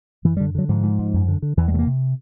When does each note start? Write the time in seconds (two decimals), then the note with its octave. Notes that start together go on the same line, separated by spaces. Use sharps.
0.25 F#2 E3
0.37 G3
0.40 D3
0.55 D3 F#3
0.69 G#2 F3
0.83 G#2
0.99 G#2
1.14 F#2
1.28 D3
1.42 D3
1.57 E2 E3
1.68 G#3
1.72 C3 A3
1.79 A#3
1.86 C3